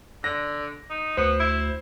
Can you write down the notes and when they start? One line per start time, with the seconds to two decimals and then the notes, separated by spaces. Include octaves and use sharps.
0.24 D3 A#6
0.90 D#4
1.17 D2 B3 C5
1.40 E4